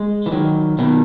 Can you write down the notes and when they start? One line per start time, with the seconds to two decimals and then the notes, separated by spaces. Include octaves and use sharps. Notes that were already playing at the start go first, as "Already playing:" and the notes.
Already playing: G#3
0.26 E3
0.32 D#3 F#3
0.79 B2 D#3